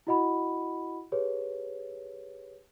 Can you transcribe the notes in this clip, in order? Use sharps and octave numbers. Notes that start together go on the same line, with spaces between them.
E4 F#4 D#5 F#5 B5
G4 G#4 B4 C#5